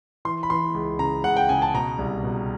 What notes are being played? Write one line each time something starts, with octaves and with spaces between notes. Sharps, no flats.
E3 C6
B5
E3 C6
C#2
C#3 A#5
C#2 F#5
G5
C#3 G#5
A5
B2 A#5
C2
B2